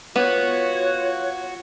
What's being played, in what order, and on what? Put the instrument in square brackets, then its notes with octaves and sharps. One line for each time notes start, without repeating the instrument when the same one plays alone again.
[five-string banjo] B3 [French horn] F4 [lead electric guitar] F#4 F#5 [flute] C#5